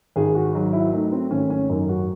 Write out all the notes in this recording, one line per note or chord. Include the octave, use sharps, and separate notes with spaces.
G#1 G#4
F#4
F#3 D#4
E4
A3 D#4
C4
G#1 C#4
C#4
F#2 D#4
F#4